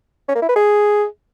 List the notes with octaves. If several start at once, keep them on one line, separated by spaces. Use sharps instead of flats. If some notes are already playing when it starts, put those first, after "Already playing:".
C#4
A#3
E4
B4
G#4